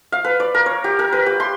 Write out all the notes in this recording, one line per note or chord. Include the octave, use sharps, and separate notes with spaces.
F5
B4
D5
A#4
C#5
G4
A#4
B4
G4
C6